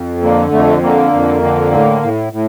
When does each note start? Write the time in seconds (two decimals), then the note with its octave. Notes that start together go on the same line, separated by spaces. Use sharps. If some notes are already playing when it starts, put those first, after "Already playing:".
Already playing: F2
0.22 D3 A#3
0.52 F2 A3
0.83 D3 A#3
1.13 F2
1.42 D3
1.72 A2
2.03 A2
2.33 A2